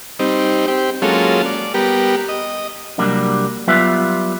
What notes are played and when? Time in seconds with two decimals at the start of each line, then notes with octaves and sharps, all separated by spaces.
0.19 G3 C4 D#4
0.68 C4 G4
1.02 F#3 G#3 A#3 C#4 F4 A4
1.46 D5
1.74 G3 B3 G4 A#4
2.29 D#5
2.98 C2 F#3 G3 A#3 D4
3.68 F#3 G3 B3 F4 B4 E5